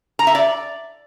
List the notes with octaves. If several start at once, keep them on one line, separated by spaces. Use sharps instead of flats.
A#5
E5
D5